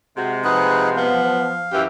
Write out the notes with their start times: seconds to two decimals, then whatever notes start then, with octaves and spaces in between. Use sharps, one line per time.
0.17 C3 G#3 F#4
0.44 F3 D#4 G#4 B4 F#5
0.97 B3 F5
1.73 F#2 E3 G4